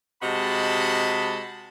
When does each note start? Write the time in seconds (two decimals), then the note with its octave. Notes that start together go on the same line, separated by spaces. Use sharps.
0.22 C3 G#3 F#4 D#5 A5 B5